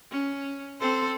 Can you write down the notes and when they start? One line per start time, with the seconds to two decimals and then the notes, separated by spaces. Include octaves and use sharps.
0.11 C#4
0.80 C4 A4 C5